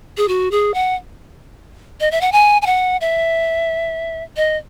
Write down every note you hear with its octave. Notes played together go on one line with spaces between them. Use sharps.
G#4
F#4
G#4
F#5
D#5
E5
F#5
G#5
G#5
F#5
E5
D#5